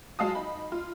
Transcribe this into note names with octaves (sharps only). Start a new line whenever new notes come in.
F#3 G#3 F5 A5 D#6
D#4 B5
F4